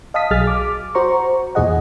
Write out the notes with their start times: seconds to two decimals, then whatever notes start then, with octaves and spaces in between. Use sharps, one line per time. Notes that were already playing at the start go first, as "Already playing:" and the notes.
0.14 D#5 F5 A5 D#6 B6
0.31 B1 F#3 G#4 F6 A6
0.47 D6
0.95 F#4 C5 A#5 C#6
1.55 E2 A#2 E3 G#4 D#5 F#5